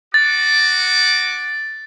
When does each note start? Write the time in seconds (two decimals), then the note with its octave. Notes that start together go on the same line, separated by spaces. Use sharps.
0.14 F#4 F#5 D6 A6